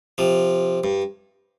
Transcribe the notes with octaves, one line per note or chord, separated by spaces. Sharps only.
C3 F3
G2